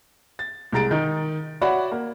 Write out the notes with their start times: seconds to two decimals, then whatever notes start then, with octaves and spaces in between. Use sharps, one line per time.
0.39 A6
0.73 C2 G#3 A#5 A6 D7
0.91 D#3 D#4
1.61 F#4 C#5 D5 E5 F#5 B5
1.92 A#3